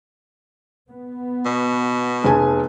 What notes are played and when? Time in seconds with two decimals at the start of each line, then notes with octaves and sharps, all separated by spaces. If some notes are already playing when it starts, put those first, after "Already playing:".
0.89 B3
1.46 B2
2.24 F1 G#4 G#5 A5